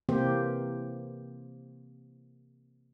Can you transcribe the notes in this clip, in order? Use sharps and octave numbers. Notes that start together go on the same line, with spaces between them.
C3 E3 A#3 C4 G4 C5